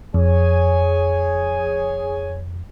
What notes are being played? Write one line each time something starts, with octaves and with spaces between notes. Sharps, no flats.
F2 G#4 C#5 G#5